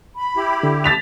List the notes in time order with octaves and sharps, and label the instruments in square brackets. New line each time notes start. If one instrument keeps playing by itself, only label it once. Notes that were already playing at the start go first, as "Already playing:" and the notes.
[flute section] B5
[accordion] E4 G4
[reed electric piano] D3
[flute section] A5 [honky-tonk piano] A6 B6 F7